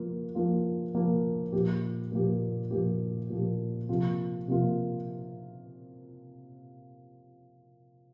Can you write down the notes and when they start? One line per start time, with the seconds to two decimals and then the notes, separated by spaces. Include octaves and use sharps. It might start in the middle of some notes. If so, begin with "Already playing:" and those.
Already playing: F3 A#3 F4
0.35 F3 A#3 F4
0.94 F3 A#3 F4
1.52 A#2 F3 A#3 G4
2.12 A#2 F3 A#3 G4
2.71 A#2 F3 A#3 G4
3.30 A#2 F3 A#3 G4
3.89 C3 F3 A#3 F4
4.48 C3 F3 A#3 F4